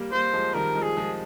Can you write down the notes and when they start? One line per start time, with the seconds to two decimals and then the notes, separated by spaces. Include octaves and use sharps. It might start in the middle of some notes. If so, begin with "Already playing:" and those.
Already playing: G3 A#3
0.12 G3 A#3 C5
0.33 F3 G#3
0.54 D#3 G3 A#4
0.75 F3 G#3
0.83 G#4
0.97 F3 G#3